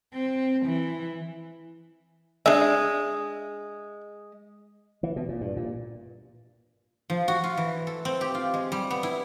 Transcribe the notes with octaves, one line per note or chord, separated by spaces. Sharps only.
C4
E3
G#3 D4 E5
E3
B2
A#2
G2
A#2
F3
F#4
F4
E3
A4
C4
G4
F4
G#3
G3
B3
E4